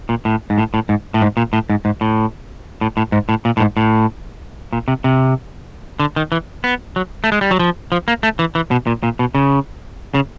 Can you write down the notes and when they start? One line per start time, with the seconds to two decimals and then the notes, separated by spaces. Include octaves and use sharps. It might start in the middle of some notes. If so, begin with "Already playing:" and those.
0.09 A#2
0.25 A2
0.50 G#2
0.58 A2
0.74 A2
0.89 G#2
1.14 A2
1.22 G#2
1.37 A#2
1.53 A2
1.70 G#2
1.85 G#2
2.01 A2
2.81 A2
2.97 A2
3.12 G#2
3.29 A2
3.45 A#2
3.57 A2
3.60 G#2
3.77 A2
4.73 A#2
4.88 C3
5.04 C3
6.00 D3
6.16 D#3
6.32 E3
6.64 B3
6.96 F#3
7.24 A3
7.32 G#3
7.41 G3
7.51 F#3
7.59 F3
7.92 F3
8.08 A#3
8.23 A3
8.39 E3
8.55 E3
8.71 B2
8.87 A#2
9.03 A#2
9.19 B2
9.35 C#3
10.14 C#3